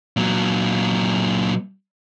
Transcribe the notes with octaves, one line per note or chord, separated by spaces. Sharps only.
A#2 F#3